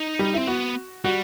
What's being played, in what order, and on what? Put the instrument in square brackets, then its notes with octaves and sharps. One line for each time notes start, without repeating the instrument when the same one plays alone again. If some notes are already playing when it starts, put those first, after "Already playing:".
Already playing: [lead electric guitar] D#4
[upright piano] G3
[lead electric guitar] C4 [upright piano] E4
[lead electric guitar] B3 [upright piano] F#4
[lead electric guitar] G3 [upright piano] F#4